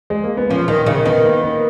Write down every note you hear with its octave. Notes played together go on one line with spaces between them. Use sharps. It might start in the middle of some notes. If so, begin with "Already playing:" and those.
G#3
A#3
B3
F3 C#4
D#3 D#4
C#3 D#4
D#3 B3
A#3
B3